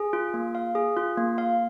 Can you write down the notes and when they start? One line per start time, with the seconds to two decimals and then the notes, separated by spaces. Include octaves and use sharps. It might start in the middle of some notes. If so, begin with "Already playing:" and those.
Already playing: G#4
0.13 F4
0.34 A#3
0.55 F5
0.75 G#4
0.97 F4
1.18 A#3
1.38 F5